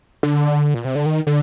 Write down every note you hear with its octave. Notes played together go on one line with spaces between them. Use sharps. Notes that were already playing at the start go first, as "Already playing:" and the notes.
D3
A#2
C3
D3
D#3
D3